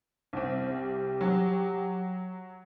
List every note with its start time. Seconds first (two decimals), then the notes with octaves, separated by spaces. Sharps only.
0.33 C2 C4
0.72 G4
1.21 F#3